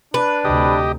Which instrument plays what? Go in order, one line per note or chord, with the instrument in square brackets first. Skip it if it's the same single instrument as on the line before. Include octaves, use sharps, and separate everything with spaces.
[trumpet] D4 [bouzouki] B4
[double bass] D2 C3 [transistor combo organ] G4 D#5